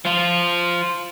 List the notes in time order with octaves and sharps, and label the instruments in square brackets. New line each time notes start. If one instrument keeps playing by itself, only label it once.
[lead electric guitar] F3 F4